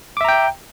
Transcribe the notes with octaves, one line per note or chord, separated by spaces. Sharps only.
E5 G5 A#5 D6